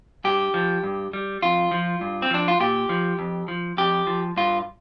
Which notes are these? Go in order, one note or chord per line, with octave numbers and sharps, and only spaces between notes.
G2 G4
F3
G2
G3
F2 F4
F3
G2
C4
F3 D4
F4
A#2 G4
F3
F2
F3
F2 G4
F3
G2 F4